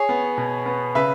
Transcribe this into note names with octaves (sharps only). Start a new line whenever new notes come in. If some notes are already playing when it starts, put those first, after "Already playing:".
Already playing: G#4 C#5
B3
B2
B3
C#3 B4 E5